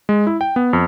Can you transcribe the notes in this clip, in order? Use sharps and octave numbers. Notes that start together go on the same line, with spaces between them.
G#3
E4
G5
B3
F2